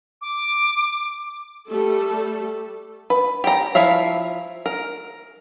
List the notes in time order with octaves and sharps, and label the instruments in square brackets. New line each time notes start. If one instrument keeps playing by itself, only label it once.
[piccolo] D6
[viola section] G3 A3 A4
[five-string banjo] B4
G4 A#5
F3 E4 E5 F5
A#4